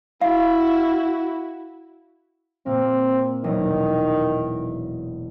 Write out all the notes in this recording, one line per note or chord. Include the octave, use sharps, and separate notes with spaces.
E4 F#4 F5
A#2 A#3 C4
E1 D#3 F#3 D#6